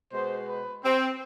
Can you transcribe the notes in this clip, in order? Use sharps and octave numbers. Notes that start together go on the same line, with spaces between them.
B2 G#3 B3 C5
B4
C4